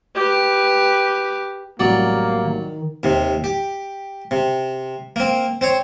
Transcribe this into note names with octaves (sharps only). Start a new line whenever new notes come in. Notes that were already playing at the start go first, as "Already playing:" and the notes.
G4 B4
A1 C3 F#3 G3 A#3 D5
D#3
D#2 C3
G4
C3
A#3 C4
C4 C5 C#5